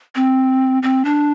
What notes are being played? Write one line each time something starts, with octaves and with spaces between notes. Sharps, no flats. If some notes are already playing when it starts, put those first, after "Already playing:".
C4
C4
D4